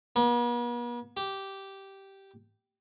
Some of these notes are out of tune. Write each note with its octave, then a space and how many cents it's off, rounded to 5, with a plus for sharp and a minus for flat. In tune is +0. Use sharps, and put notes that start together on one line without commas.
B3 -45
G4 -10